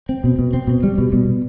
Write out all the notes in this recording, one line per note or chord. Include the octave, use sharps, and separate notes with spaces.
C4
B2
B2
C4
B2
G3
B2
B2